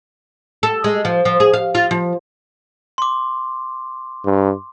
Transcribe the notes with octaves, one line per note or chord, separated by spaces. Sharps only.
A4
G#3
F3
F3
G#4
F5
F4
F3
C6 D6
G2